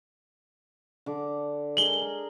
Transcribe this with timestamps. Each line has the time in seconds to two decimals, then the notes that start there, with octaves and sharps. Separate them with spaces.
1.06 D3 D6
1.77 G#3 G#4 A#4 F#7 G7
2.02 A#4